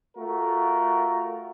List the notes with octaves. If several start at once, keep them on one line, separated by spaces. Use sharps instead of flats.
A3 F4 F#4 A#4